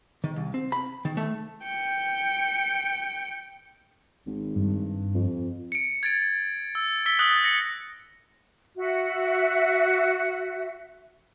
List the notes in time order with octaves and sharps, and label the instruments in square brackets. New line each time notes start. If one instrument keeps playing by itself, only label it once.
[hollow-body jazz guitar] D#3
C2
C4
B5
D#3
A3
[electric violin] G5 C#7
[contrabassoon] G#1
[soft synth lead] G2
[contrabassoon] F2
[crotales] C#7 D7
G#6 A6 D7
E6
E6 B6 G7
D#6 F#6 A6
A#6 C#7
[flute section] F#4 E5